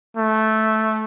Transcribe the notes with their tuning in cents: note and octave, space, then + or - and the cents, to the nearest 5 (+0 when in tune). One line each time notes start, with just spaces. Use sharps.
A3 -10